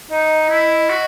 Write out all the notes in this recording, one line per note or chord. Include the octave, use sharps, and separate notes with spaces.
D#4 D#5
E4
F#4